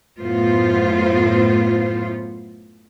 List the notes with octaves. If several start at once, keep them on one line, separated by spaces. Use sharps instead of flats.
F#2 A2 B3 F4 C5